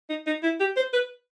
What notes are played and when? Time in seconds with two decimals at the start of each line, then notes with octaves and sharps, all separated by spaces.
0.10 D#4
0.27 D#4
0.43 E4
0.61 G4
0.77 C5
0.93 B4